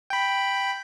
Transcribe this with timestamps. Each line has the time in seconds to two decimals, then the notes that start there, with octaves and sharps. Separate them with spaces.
0.10 G5 B5